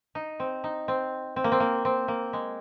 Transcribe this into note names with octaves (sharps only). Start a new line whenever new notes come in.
D#4
C4
D#4
C4
C4
A#3
C4
A#3
C4
A#3
G#3